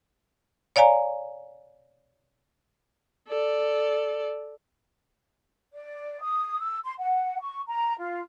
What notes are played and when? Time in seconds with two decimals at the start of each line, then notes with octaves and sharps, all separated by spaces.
0.76 C#5 D5 F5 G#5 A#5
3.28 A4 D5
5.74 D5
6.21 D#6
6.60 E6
6.84 C6
6.99 F#5
7.40 C#6
7.68 A#5
7.98 F4